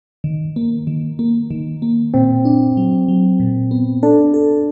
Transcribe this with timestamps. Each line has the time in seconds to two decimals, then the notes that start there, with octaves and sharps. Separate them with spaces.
0.24 D#3
0.56 A#3
0.87 D#3
1.19 A#3
1.51 D#3
1.82 A#3
2.14 A#2 C4
2.45 D4
2.77 F#3
3.08 F#3
3.40 A#2
3.71 B3
4.03 D4 A4
4.34 A4